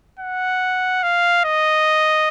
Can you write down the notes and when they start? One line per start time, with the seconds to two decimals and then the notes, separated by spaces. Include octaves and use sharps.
0.19 F#5
1.03 F5
1.44 D#5